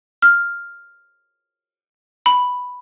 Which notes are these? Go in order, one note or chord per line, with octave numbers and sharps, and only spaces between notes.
F6
B5